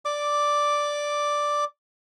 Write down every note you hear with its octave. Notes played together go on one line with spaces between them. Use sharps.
D5 D6